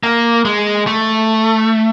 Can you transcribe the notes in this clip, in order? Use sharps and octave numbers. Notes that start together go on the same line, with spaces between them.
A#3
G#3
A3